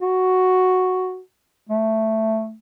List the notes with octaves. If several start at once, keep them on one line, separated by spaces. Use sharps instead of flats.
F#4
A3